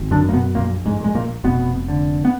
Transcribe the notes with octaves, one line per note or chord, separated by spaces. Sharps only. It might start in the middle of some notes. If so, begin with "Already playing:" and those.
Already playing: G#1
F#2 D3 D4
A#3
B2 B3
A#1 A#2 A#3
G#2 G#3
A#2 G#3
A#2 A#3
F1 B2 B3
D3
B3